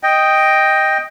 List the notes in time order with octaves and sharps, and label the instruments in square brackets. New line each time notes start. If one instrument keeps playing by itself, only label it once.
[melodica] D#5 G5